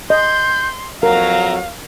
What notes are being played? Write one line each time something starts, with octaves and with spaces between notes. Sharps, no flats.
D#5 C6 G6
F2 F#3 A#4 F5 A#5